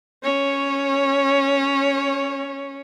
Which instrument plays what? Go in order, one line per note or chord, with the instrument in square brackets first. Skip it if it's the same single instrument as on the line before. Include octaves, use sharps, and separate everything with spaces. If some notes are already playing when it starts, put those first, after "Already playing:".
[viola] C#4 C#5